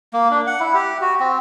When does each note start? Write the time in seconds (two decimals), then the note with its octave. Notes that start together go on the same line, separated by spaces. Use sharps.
0.13 A#3
0.31 D4
0.47 F#5
0.60 E4
0.74 G4
1.01 F#4
1.20 C4